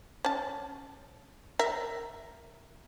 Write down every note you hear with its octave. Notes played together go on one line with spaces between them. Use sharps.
C#4 A5
A#4 E5